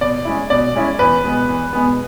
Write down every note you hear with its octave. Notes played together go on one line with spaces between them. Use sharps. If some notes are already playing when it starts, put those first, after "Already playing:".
B2 D5
G#3 C#4 E4
B2 D5
G#3 C#4 E4
E2 B4
B2 G#3 B3
E2
B2 G#3 B3